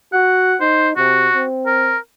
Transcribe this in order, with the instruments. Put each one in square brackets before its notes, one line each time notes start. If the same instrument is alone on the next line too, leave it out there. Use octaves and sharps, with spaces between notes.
[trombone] F#4 [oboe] F#5
[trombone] D#4 [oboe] C5
[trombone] C3 [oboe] F#4
[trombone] C4
[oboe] A#4